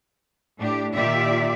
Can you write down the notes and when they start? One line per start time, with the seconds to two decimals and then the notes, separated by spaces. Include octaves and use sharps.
0.59 A2 D4 G4
0.94 A#2 D#3 F4 G4 D5 E5